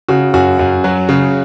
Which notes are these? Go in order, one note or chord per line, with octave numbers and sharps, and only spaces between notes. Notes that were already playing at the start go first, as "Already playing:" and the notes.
C#3 F#4
F#2 F#4
F#2
F#3
C#3